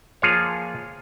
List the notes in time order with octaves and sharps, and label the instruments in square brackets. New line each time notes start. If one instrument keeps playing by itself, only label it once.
[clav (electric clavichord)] F3 A#3 F4 G#4 C#5